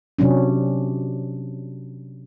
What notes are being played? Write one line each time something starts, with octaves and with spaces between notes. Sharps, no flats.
C3 F#3 C#4 D4